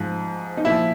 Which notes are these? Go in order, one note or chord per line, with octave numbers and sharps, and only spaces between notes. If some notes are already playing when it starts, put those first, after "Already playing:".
Already playing: G#2 F3
D#4
A#2 F3 E4